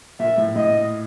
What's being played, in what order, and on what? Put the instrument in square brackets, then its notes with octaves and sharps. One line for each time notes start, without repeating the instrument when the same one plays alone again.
[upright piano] A#2 [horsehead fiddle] E5
[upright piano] A2
[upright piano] A2 [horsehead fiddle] D#5